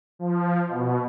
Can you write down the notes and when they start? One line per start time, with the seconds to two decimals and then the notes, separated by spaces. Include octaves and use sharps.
0.19 F3
0.68 B2